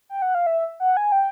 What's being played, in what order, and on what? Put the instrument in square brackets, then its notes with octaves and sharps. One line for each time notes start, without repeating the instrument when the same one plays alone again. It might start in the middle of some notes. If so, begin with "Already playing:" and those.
[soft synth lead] G5
F#5
F5
E5
F#5
G#5
G5